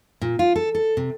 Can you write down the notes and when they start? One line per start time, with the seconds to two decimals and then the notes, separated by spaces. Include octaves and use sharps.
0.21 A#2
0.39 F4
0.56 A4
0.75 A4
0.97 C3